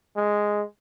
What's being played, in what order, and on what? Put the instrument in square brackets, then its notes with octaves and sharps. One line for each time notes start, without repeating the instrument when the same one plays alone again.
[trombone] G#3